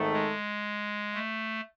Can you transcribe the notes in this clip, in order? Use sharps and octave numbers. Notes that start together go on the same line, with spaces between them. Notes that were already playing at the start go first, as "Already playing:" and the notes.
Already playing: G#1 G#2 D#3 A3 D#4
G#3
A3